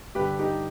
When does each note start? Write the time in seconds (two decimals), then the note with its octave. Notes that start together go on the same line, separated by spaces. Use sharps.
0.15 G2 D3 G4 B4
0.39 D#4 G4